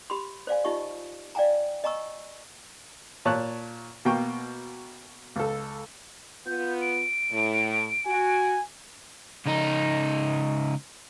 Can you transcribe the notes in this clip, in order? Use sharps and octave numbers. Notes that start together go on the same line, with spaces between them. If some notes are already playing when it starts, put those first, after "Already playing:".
G4 B5 C6
C5 D5 F5 G#5
D#4 F4 G4 D#5 C#6
D5 F5 G5 G#5 A#5
D#5 G#5 A#5 C#6 E6
A#2 C#5 A5 C#6 F#6
B2 A#3 G5 C#6
C#2 A4
B3 F4 G6
D7
A2
F#4 G#5
C#2 D#4